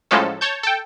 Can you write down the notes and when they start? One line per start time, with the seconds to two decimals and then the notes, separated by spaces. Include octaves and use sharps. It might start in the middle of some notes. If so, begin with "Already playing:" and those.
0.11 A2 F3 F#3 G#3 C#4 A4
0.41 C#5 A5 G6
0.63 A4 G5